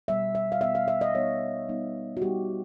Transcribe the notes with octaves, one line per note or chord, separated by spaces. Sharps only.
B2 G3 B3 E5
E5
F5
B2 G3 B3 E5
F5
E5
D#5
G3 B3 D#4 C#5
G3 B3 D#4
F#4
G3 B3 D#4 G4